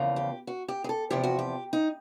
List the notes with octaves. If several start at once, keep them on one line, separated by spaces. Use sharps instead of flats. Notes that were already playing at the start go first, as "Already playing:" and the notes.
Already playing: E2 C#3 F3 A#3
G4
F#4
G4
G#4
A4
E2 C3 F3 G4
F#4
G4
D#4